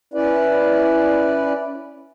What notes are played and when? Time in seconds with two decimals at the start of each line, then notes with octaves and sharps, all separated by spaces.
0.14 C#4 E4 B4 D5